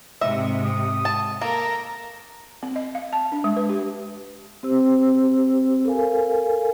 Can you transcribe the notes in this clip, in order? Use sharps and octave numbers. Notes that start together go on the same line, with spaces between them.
G#2 C3 D#5 E5
D#6
A5
A#3 A4 A#4 A#5
C4
D#5
F5
A5
D4
G#3
B4
G4
C4 G4 C5 E6
A4 A#4 F5 G#5